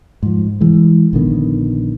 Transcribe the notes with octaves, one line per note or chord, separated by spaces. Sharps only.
G#2 F3
E3 G#3
A#1 D3 D#3 B3